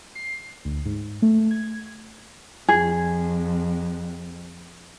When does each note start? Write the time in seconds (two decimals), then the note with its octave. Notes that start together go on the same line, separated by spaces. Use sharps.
0.15 C7
0.65 D2
0.85 G#2
1.22 A3
1.51 G#6
2.68 F2 G#4